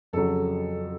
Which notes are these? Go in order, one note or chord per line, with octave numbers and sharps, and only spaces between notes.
F2 C#3 F#3 A4